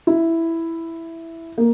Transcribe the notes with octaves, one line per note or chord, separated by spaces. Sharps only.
E4
A#3